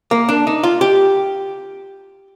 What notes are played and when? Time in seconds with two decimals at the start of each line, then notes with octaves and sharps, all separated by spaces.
0.11 A#3
0.29 D4
0.47 D#4
0.63 F4
0.81 G4